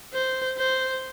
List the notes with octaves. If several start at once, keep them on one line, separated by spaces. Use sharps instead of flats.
C5
C5